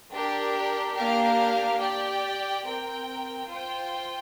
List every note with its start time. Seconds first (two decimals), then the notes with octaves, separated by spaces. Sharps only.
0.13 D4 G4 A#4
0.96 A#3 D4 G4 A#4 F5
1.80 G4 D5 G5
2.64 C4 A#4 G5
3.48 F4 C5 G5